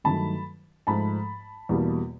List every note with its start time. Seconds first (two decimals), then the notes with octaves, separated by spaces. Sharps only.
0.04 G2 D#3 F#3 A3 A5 B5
0.87 G#2 F3 A3 A5 B5
1.69 E2 B2 G3 A#3